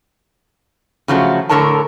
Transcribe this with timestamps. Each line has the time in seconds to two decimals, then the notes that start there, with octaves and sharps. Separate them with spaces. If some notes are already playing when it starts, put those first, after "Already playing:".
1.08 C#3 F3 F#3 A3
1.49 A2 D3 A4 A#4 C#5 A5